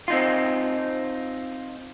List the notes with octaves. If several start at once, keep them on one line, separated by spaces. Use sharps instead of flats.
C4 D#4 F4